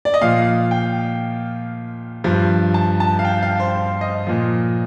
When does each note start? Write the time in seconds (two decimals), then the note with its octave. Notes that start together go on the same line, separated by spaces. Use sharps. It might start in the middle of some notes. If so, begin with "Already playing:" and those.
0.05 D5
0.14 D#5
0.22 A#2 F3 F5
0.71 G5
2.24 G2 F3
2.74 A5
3.00 A5
3.19 F5
3.25 G5
3.43 F5
3.60 C5
3.76 C5
4.01 D#5
4.27 A#2 F3